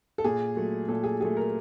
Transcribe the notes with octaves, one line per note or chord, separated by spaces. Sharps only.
A4
A#2 G#4
F#3 A3
A#2 A4
G#4
F#3 A3 G#4
A#4